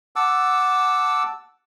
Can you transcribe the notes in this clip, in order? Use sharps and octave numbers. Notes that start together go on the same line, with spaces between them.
F#5 A5 D6 E6